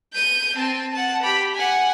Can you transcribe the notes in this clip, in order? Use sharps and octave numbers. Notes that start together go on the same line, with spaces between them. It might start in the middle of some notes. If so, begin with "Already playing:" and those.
G6 D#7
C4 A5
F#5 A5
G4 B5
F#5 G#5